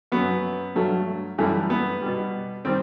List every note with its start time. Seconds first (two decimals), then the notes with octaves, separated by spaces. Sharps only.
0.12 F#2 F#3 B3
0.75 G2 F#3 A3
1.38 F#2 E3 G3 A3
1.70 B3
2.02 B2 G3
2.65 D#3 G3 C4